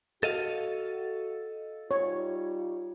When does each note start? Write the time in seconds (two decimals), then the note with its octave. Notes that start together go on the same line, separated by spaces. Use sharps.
0.23 F#4 A4 D#5 F5
1.91 G3 D#4 F4 C#5